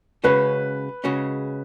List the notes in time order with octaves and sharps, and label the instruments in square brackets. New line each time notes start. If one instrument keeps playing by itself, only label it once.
[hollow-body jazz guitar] C#3 G#3 C#4 F#4 [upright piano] B4
[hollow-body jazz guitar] C#3 G#3 C#4 F#4